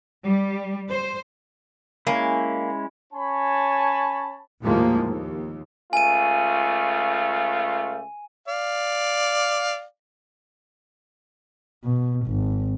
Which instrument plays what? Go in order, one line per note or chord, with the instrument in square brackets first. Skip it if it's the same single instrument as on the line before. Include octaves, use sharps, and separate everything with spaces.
[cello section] G3
C5
[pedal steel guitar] G#3 C#4 E4 [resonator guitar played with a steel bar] A#3
[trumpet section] C#4 C#5 G#5 A5 B5
[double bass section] D#2 A2 D#3 F3 G#3 A#3
D#2
[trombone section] C#2 A3 F4 [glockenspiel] G#5 D#7
[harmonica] D5 F5
[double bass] B2
G#1